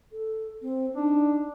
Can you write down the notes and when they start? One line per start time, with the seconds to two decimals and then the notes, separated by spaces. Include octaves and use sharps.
0.12 A4
0.62 C4
0.95 D4 D#4